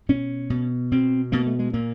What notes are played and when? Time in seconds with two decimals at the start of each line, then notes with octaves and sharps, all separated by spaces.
0.09 B2 C#4
0.50 B2
0.92 B2 C4
1.32 B2 A#3
1.47 A3
1.59 G#3
1.73 A#2 A#3